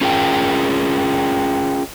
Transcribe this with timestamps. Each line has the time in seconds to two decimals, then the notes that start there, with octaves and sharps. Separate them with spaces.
0.01 C#4 F4 G#4 A#4 G5